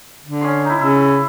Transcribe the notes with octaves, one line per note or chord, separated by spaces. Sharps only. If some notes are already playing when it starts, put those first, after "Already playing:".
D3
C#4 D#5 C6
D#4 E4
C#3 E4 E5